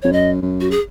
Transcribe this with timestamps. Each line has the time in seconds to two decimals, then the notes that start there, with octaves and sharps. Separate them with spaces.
0.02 F2 C#5
0.12 F#2 D#5
0.42 F#2
0.60 F#4
0.71 G#4